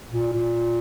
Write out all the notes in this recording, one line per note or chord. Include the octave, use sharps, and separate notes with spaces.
A#2
A#2